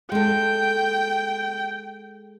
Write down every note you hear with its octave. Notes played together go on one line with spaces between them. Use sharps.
G#3 A4 G5